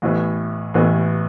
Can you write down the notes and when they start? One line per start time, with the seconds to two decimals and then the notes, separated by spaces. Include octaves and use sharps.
0.02 A1 A2 E3 B3
0.74 A1 A2 E3 B3